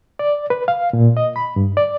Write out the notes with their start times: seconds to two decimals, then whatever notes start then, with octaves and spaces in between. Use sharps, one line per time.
0.19 D5
0.50 B4
0.68 F5
0.93 A#2
1.17 D#5
1.36 B5
1.56 G2
1.77 D5